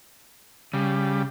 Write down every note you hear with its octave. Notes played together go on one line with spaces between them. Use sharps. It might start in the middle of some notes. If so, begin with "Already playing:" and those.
C#3 G3